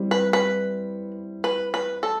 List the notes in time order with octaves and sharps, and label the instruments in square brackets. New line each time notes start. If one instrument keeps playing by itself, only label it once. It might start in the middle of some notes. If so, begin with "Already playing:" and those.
Already playing: [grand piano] G3 C4 E4
[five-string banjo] B4
B4
B4
B4
A4